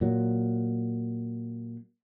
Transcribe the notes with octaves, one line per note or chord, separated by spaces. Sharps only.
A#2 F#3